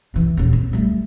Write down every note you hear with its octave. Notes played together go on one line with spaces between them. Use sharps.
C2 E3
D#1 D#2
C4
G3 A3